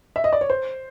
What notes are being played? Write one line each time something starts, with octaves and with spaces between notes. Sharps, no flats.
E5
D#5
D5
C#5
C5